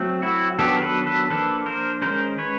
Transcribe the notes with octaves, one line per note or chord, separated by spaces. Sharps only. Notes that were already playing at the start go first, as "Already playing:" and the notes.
Already playing: F#3 A3 C4
E4 F#4
D#3 F#3 B3 D4 G4 A4
A#4
A4 B4
A4 B4
F3 A#3 D4 A4 B4
A#4 C5
D#3 G#3 C#4 A#4 C5
B4 C#5